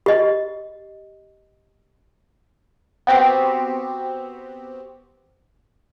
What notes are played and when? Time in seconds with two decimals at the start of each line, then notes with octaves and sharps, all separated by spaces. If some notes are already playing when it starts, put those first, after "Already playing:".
0.06 G4 D#5
3.07 B3 C4 F#4 G4